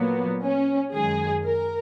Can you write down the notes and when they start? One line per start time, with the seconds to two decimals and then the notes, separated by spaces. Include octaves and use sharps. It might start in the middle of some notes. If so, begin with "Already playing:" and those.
Already playing: A#2 F#3 A#3 B3
0.43 C#4
0.93 F#2 D#3 G#3 G#4
1.44 A#4